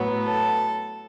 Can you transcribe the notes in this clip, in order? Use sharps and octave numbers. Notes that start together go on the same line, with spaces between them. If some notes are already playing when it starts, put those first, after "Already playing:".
Already playing: A2 F#3 B3
A4